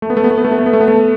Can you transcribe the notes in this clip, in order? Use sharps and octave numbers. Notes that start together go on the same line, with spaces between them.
A3
B3
A3
B3
A3
B3
A3
B3
A3
B3
A3
B3
A3